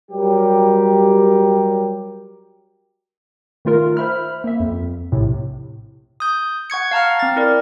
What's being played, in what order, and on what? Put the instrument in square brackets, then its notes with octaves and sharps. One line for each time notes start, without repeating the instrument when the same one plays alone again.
[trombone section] F#3 G3 G4 A#4
[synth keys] D#3 A3 F4 A#4
C5 E5 B5 F6
A#3 E5
F2
A#1 A2 C3
[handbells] D#6 G6
F#5 C#6 G#6 C#7
F5 A5 A#5 F6
C4 A6
E4 A#4 D5